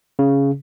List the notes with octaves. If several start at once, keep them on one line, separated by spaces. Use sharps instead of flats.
C#3